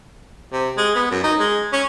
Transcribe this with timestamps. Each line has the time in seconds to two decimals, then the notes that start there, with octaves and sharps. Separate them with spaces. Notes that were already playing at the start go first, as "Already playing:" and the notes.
0.52 C3
0.77 G#3
0.95 B3
1.11 F#2
1.23 D#4
1.39 G#3
1.72 C#4